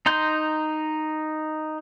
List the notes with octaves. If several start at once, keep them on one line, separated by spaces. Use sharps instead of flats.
D#4 A#5 C6 G6